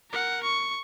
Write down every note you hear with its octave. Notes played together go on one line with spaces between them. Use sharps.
A#4 F#5
C#6